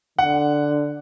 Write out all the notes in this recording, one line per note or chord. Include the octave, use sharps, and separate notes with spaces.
D3 F#5